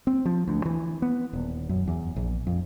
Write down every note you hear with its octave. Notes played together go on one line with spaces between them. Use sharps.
C4
F3
D2
E3
B3
D#1
F#2
E2
A#1
F2